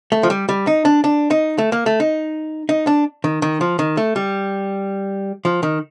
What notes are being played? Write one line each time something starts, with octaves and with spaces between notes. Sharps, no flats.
A3
F3
G3
G3
D#4
D4
D4
D#4
A3
A#3
A3
D#4
D#4
D4
D#3
D#3
F3
D#3
A3
G3
F3
D#3